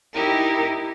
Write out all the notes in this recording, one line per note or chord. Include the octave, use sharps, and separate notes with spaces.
D#4 E4 G4 A#4